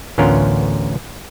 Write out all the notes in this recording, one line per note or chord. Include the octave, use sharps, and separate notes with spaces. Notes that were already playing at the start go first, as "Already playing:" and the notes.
A1 D2 B3 C#4 F4 A#4